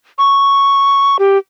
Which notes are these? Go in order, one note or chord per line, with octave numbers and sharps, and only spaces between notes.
C#6
G4